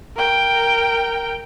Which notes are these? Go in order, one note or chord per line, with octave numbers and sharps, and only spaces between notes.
A#4 G5